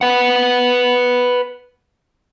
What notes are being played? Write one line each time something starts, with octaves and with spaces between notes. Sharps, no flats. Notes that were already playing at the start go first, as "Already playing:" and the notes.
B4 F#5